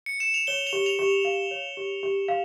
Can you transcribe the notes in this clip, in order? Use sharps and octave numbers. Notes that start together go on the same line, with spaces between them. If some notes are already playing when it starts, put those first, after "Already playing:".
C#7
E7
F7
C#5 G7
F7
G4
F7
G4
F5
C#5
G4
G4
F5